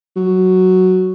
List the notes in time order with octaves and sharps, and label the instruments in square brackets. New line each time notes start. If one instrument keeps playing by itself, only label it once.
[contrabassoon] F#3